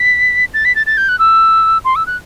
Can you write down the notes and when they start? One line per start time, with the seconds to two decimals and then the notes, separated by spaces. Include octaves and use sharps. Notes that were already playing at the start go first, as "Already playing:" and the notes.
Already playing: B6
0.54 A6
0.65 B6
0.75 A6
0.87 A6
0.97 G6
1.09 F#6
1.19 E6
1.85 C6
1.96 E6
2.07 F#6